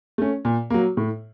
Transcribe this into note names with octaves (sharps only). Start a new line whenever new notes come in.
A3 C#4
A#2
F#3 A#3
A2